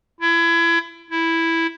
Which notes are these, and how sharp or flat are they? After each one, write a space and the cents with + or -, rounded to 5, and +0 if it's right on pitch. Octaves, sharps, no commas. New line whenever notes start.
E4 +30
E4 +0